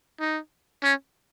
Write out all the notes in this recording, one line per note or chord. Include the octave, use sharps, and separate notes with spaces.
D#4
C#4